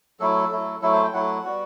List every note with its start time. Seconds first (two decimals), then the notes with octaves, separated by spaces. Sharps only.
0.20 F#3 A3 E4 A4
0.51 F#3 A3 E4
0.82 F#3 A3 E4 A4
0.93 C5
1.03 G5
1.13 F#3 A3 E4 F#5
1.44 G3 B3 F#4